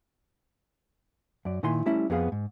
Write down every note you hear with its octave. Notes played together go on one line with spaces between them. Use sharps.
F#2 D5
A#2 D#3 E4 G#5 C6
G3 A3 C#4 E4
F2 B3 G#4 F5
G#2